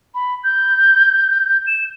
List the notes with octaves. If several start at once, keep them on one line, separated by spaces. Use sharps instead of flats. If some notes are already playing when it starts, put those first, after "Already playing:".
B5
G6
E7